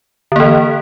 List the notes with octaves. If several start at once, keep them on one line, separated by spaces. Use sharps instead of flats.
D3 E3 A#3